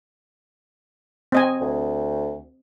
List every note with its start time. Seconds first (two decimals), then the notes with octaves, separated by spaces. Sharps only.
1.32 C4 D#5 G#5
1.61 D2